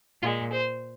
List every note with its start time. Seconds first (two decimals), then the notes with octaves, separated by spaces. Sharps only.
0.23 A#2 F4
0.27 G#3
0.52 C5